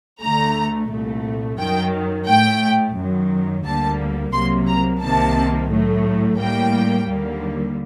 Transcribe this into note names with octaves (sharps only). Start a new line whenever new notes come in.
D2 D3 A3 A#5
C2 A#2 A3
F#2 D#3 F#3 G5
A2 A3 G5
F#2 D#3 F#3
D2 D3 G3 A#3 A5
C2 C3 F#3 A#3 C6
A#5
C2 C3 D#3 G3 A#3 A5
A2 F#3 A3
A2 G3 A#3 G5
D#2 D3 G3 A#3